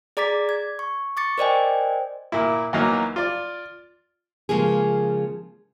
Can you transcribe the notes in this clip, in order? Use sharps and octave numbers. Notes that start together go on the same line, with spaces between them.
G#4 D5 A#5 D6 A6 B6
G#6
C#6
C#6 D6 A6 C#7
A#4 C5 D5 D#5 G5 G#5
A#2 A#3 E4
E2 F#3 A#3 D#4
F4 D5
C#3 F3 G#3 A#3 G#4